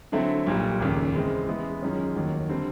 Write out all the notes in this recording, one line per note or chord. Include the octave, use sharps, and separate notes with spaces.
D3 F#3 A3 C4 E4
B1 A#2 G3
F1 D#2 C#3
C#3 E3 G#3 C4
C#3 E3 G#3 B3 E4
F#2 D#3 G#3 C#4 F4
F1 D#2 D#3 F#3
D3 G3 C4